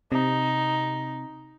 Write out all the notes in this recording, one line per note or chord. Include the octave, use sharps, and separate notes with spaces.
C3 D#4